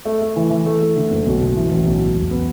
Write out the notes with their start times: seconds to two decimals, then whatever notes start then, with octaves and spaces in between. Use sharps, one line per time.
0.05 A3
0.22 A3
0.36 E3
0.50 E3
0.66 A3
0.82 A3
0.96 D3
1.10 F#1
1.26 B1
1.40 B2
1.56 E3
1.71 A1
1.86 B1
2.01 B2
2.16 E1
2.31 B3